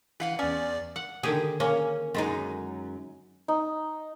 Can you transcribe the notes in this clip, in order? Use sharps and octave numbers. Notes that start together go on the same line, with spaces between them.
E3 B4 F5 F#5
E2 C#4 D5
F#5
D3 D#3 G4 G#4
A#3 C#4
F#2 G#3 D#4
D#4